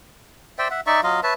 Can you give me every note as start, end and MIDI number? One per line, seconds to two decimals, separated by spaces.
0.58 0.68 72
0.58 0.68 74
0.58 0.68 76
0.58 0.68 79
0.70 0.81 76
0.70 0.81 78
0.87 1.01 63
0.87 1.01 74
0.87 1.01 76
0.87 1.01 85
1.03 1.21 54
1.03 1.21 65
1.03 1.21 75
1.03 1.21 77
1.23 1.34 71
1.23 1.34 73
1.23 1.34 76
1.23 1.34 81